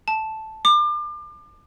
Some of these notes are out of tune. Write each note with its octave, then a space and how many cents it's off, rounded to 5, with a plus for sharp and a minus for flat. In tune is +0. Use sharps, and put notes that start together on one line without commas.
A5 -5
D6 +35